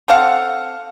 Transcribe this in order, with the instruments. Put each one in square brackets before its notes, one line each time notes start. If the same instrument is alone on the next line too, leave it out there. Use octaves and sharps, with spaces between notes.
[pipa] C4 A4 F5 F#5